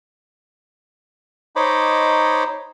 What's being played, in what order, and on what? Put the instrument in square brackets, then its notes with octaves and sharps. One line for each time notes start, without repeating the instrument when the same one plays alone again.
[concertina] D#4 C5 C#5 D#5 B5 D6